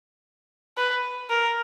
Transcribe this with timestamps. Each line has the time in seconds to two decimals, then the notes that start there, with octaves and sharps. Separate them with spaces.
0.77 B4
1.30 A#4